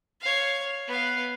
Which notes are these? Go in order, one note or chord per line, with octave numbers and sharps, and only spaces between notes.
C#5 F5
B3 F5